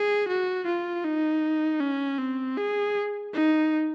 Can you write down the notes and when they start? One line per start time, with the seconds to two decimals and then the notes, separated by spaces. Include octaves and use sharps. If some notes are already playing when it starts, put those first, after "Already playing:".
Already playing: G#4
0.28 F#4
0.66 F4
1.04 D#4
1.81 C#4
2.18 C4
2.58 G#4
3.34 D#4